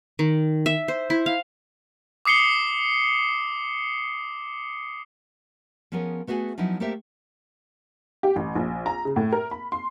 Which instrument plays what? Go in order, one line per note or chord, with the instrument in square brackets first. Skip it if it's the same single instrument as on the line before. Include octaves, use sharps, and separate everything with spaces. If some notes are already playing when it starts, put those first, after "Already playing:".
[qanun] D#3
E5
C5
E4
F5
[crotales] D6 D#6 C7 C#7 G7
[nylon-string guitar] F3 B3 C#4 G#4 A#4 C#5
A3 B3 F#4 G#4 G#5
F3 F#3 B3 C#4 D#4 E4
A3 A#3 C4 G4 C5 E5
[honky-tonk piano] G4
A1
A#1
A#5
C#3
A2
A#4
B5
C6